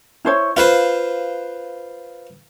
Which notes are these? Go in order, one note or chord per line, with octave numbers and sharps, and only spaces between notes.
E4 C5 C#5
F4 B4 C5 F5